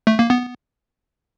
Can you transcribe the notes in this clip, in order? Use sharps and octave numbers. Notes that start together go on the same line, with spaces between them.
A3
A#3
B3